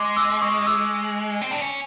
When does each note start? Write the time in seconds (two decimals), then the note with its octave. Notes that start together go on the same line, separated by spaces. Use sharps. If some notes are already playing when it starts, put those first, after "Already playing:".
Already playing: G#3 C6 D6
0.17 D6 E6
0.41 C#6 D#6
0.66 D6 E6
1.41 C4
1.51 D4
1.61 C#4